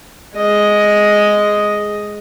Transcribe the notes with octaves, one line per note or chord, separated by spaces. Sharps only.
G#3 D#5